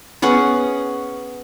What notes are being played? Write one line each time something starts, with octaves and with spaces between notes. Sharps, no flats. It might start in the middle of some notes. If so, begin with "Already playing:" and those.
B3 C#4 G#4 F#5